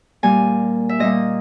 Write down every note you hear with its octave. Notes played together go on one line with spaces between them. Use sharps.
A#2 G3 A#3 G#5
E5
A#2 G3 A#3 D#5